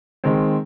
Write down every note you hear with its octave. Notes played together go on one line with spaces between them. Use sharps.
D#3 G#3 C4